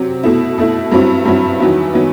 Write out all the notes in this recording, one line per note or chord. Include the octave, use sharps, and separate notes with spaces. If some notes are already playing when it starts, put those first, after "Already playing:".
Already playing: C3 F#3 C4
B2 A3 E4
B2 A3 E4
G2 F#3 C4 E4
G2 F#3 C4 E4
E2 D#3 F#3 B3 E4
D#3 F#3 B3 E4